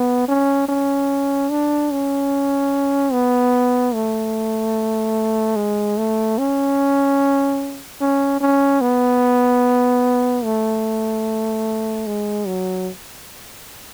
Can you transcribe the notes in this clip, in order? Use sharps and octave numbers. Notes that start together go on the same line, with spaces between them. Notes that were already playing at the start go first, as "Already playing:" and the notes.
Already playing: B3
C#4
C#4
D4
C#4
B3
A3
G#3
A3
C#4
C#4
C#4
B3
A3
G#3
F#3